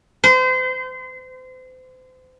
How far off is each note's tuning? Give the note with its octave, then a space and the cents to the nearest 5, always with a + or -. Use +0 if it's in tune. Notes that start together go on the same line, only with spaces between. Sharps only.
C5 -35